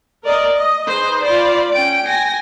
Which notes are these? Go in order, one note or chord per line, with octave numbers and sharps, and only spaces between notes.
A#4 D5 D#5
D#5
D#4 G#4 B4 C5 D#5
F4 C5 D5 B5
C#4 G5 D7
G#5 A#6